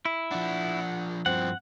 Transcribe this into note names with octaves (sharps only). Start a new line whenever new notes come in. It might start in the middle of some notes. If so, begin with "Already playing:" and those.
E4
F3 D4 F#5
G2 F3 C4 F#5